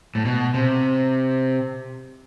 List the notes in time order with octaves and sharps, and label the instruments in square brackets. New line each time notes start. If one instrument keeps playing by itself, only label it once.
[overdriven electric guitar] A2
B2
C3